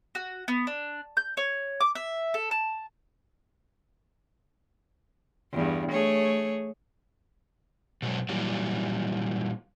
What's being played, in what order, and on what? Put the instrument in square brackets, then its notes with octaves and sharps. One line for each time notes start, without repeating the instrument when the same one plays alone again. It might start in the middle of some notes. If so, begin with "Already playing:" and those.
[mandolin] F#4
B3
D4
G6
C#5
D6
E5
A4
A5
[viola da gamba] E2 G2
A3 G#4 C#5
[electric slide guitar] B2 F#3 G#3
A#2 E3 F#3 G3